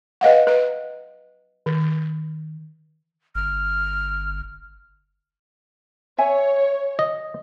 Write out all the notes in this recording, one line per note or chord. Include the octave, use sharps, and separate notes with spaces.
B4 D#5 F5 F#5
B4
D#3
G1 F6
C#5 E5 G#5
D#5